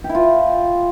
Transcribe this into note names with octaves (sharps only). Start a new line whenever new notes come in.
G4
E4
F4